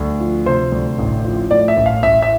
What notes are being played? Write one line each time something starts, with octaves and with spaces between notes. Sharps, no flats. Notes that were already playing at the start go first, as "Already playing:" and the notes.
Already playing: D2
F3
C3 C5
D2
A1
F3
A2 D5
E5
A1
F5
A1 E5
E5